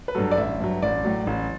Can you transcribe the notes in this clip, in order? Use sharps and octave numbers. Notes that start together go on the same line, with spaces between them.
B4
G2 F#3 A4
D5
A1 E5
G2 F#3
A1 D5
A2 F#3
A1